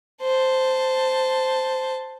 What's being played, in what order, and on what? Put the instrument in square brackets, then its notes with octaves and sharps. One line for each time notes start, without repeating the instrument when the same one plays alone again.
[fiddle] C5 A5